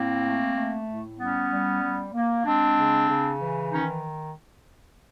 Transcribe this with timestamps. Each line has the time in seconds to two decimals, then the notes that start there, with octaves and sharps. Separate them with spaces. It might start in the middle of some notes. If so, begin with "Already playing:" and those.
Already playing: A2 A#3 C4
0.24 A3
0.55 A3
0.87 A2
1.18 G3 B3 C#4
1.50 G3
1.83 G3
2.13 A#3
2.45 G#3 C4 D4
2.77 C#3
3.10 C#3
3.41 E3
3.72 D#3 C#4 D#4